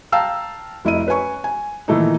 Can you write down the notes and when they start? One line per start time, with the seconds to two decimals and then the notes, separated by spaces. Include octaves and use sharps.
0.12 F5 G5 A5 A#5 E6
0.85 F1 E4 D#5 D#7
1.07 C#4 B4 C#5 G#5 C#6
1.44 G#5
1.88 A#2 D#3 E3 A3 D#4